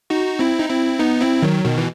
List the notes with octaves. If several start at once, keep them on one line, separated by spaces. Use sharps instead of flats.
D#4 F#4
C4 E4
D#4
C4 E4
B3 D#4
C4 E4
D#3 F#3
B2 D#3
E3